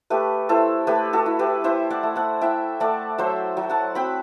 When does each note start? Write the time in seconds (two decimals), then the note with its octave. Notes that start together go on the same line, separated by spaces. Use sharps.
0.10 A3 G4 B4
0.49 E4 A4 C5
0.87 A3 G4 B4
1.13 F#4 A4
1.26 E4
1.39 G4 B4
1.64 E4 C5 E5
1.90 D5 F#5
2.03 A3
2.16 F#5 A5
2.41 E4 E5 G5
2.80 A3 D5 F#5
3.18 F#3 C5 E5
3.57 F#3
3.70 F#5 A5
3.95 C4 G5 B5